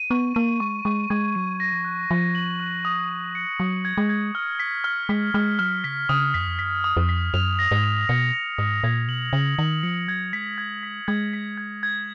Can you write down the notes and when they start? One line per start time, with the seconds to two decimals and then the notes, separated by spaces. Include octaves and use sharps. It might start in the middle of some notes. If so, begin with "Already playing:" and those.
Already playing: D#7
0.11 B3 C#6
0.35 A#3 D#7
0.60 G#3 C#6
0.85 G#3 C#6
1.10 G#3 G#6
1.35 F#3 D#7
1.60 A#6
1.72 F3
1.85 F#6
2.10 F3 D#7
2.35 F#7
2.60 F#6
2.85 D#6
3.10 D#6
3.35 C#7
3.59 F#3 D#6
3.85 G#6
3.98 G#3
4.09 G#6
4.35 F6
4.60 B6
4.84 F6
5.09 G#3 B6
5.34 G#3 F6
5.59 F#3 F6
5.84 C#3 B6
6.09 C#3 D#6
6.34 F2 B6
6.41 F#2
6.48 F2
6.59 F#2 B6
6.84 D#6
6.97 F2
7.09 B6
7.34 F#2 F7
7.59 A#6
7.71 G#2
7.84 F7
8.09 B2 C#7
8.33 C#7
8.58 G#2 D#6
8.83 A#2 G#6
9.08 B2 F#7
9.33 C#3 F#7
9.58 D#3 F#7
9.83 F3 C#7
10.08 F#3 G#6
10.33 G#3 B6
10.58 G#6
10.83 B6
11.08 G#3 G#6
11.33 B6
11.58 G#6
11.83 G#6